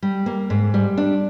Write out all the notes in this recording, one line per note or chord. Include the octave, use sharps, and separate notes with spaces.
G3
A#3
G#2
G3
D4